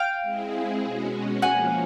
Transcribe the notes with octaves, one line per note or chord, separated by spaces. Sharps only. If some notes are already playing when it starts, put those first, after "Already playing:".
Already playing: F5 G5
G#3 C4 E4 G#4
B2 G#3 C#4 F#4
F3 A#3 C#4 F#5 G#5